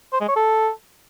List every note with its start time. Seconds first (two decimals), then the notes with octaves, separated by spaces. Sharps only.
0.13 C5
0.21 G#3
0.28 C#5
0.36 A4